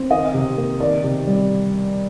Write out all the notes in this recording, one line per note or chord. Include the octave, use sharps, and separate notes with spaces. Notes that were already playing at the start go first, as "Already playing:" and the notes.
Already playing: C4
D#3 D#5
C3
A#3
D#3 D5
C3
G3